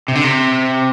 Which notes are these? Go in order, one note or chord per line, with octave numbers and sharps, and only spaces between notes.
C3
D3
C3